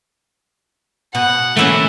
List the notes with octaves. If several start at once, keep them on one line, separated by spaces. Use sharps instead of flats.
B2 F#5
E3 A3 A#3 C#4 E4